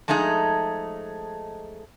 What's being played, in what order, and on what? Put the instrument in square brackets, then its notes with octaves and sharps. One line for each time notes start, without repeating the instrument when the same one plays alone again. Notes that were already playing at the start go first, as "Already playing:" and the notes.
[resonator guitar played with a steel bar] F3 G#3 A3 D#4 G#4